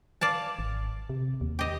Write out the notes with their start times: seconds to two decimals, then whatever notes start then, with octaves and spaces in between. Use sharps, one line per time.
0.21 D5 F5 A5
0.59 G#1
1.09 C3
1.41 D#2
1.59 G4 D#5